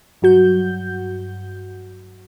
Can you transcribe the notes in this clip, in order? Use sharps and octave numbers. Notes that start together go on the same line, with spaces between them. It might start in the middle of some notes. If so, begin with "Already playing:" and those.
G2 F#3 F#4 G6